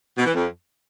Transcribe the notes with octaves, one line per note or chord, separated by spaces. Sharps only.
B2
E3
F2